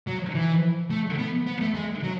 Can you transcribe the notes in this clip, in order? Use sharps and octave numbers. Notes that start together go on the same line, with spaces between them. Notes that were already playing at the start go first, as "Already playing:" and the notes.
F#3
E3
A3
B3
B3
A3
G#3
F#3